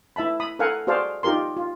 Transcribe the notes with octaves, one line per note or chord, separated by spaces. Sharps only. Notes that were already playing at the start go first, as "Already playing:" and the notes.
E4 E5 A5 B5
B5 D#6
A4 A#4 F5 F#5 G#5
F#4 G#4 C5 D5 F5 A5
D#4 F4 G4 A#4 C6
F4